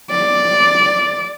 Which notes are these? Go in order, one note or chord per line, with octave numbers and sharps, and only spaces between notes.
D5